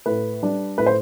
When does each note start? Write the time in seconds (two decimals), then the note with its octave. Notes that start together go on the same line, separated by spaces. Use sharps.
0.06 A2 B4
0.42 G3 D4
0.78 A2 B4
0.87 C5